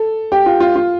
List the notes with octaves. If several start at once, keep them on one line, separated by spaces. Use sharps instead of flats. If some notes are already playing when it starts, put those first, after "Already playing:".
Already playing: A4
G4
F4
F4
F4